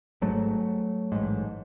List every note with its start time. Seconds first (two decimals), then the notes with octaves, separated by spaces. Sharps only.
0.22 G#1 G#2 F#3 A3
1.12 A1 G#2